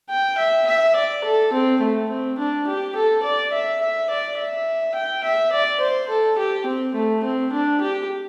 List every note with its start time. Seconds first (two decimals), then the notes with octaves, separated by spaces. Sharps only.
0.10 G5
0.38 E5
0.67 E5
0.95 D5
1.24 A4
1.52 C4
1.81 A3
2.09 C4
2.38 D4
2.67 G4
2.95 A4
3.23 D5
3.52 E5
3.81 E5
4.10 D5
4.38 E5
4.95 G5
5.24 E5
5.52 D5
5.80 C5
6.09 A4
6.38 G4
6.66 C4
6.94 A3
7.23 C4
7.52 D4
7.81 G4